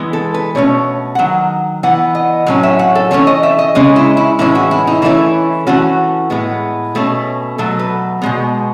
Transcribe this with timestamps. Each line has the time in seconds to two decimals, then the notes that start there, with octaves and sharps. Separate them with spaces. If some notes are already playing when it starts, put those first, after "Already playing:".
Already playing: E3 G#3 B3
0.13 A4
0.34 B4
0.55 B2 A3 C#4 C#5
1.15 F#5
1.19 D#3 F#3
1.83 E3 B3 F#5
2.15 D#5
2.47 A2 F#3 C#4
2.63 E5
2.79 F#5
2.95 A4
3.11 E3 A3 C#4 C#5
3.27 D#5
3.43 E5
3.59 D#5
3.75 C#3 G#3 C#4 D#5
3.96 E4
4.17 E4
4.39 A2 E3 G#3 C#4 E4
4.55 F#4
4.71 E4
4.87 D#4
5.02 E3 A3 C#4 E4
5.67 E3 A3 C#4 F#4
6.30 A2 G#3 B3
6.95 B2 A3 C#4
7.58 B2 F#3 A3 A4
7.79 B4
8.22 B2 G#3 B3